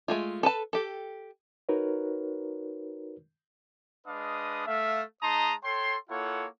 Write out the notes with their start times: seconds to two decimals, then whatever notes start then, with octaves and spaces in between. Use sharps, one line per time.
0.08 G#3 A3 F4
0.43 A4 B4 A5
0.73 G4 A4
1.69 D#4 F#4 A#4 B4 C#5
4.07 G#3 D4 B4 D#5 F5 D#6
4.67 A3 E5 F5
5.22 G#3 D#4 A5 A#5 C6 D#6
5.64 A4 C#5 G5 C6
6.10 A#3 E4 F4 A4 C#5 F#5